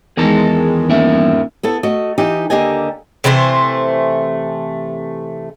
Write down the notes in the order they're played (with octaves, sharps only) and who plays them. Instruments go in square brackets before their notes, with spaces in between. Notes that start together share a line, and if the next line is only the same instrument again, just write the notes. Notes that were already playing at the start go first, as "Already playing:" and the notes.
[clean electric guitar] E2 [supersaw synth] D#3 G#3 [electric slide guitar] G#4 A#4 A5
[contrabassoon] D#1 [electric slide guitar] G2 A#4 E5
[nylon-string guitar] B3 E4 A4
A3 F#4 D#5
E3 D#4 G4
D#2 D3 A#3 G4 D#5 G#5
[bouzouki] C3 E3 A3 C5